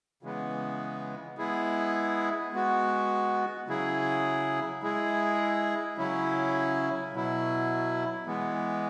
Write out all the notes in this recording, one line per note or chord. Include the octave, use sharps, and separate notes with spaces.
C#3 E3 G#3 B3
G#3 B3 E4 G#4
G#3 B3 F#4
C#3 F#3 E4 G#4
G#3 E4 G#4
C#3 F#3 C#4 E4
B2 F#3 E4
E3 G#3 B3